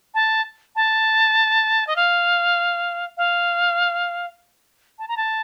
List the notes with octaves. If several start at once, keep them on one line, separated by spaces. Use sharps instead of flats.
A5
A5
D#5
F5
F5
A5
A#5
A5